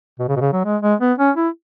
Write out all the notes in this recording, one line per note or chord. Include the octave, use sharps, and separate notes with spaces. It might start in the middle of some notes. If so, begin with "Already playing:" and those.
B2
C#3
B2
C#3
F#3
G#3
G#3
B3
C#4
E4